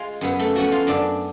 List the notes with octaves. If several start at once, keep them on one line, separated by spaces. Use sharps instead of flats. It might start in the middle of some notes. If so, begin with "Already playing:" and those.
Already playing: G#3 F4 F5
F#2 B3 B4
A3 A4
F3 A3 C#4 F#4
F4 F5
F#2 D4 D5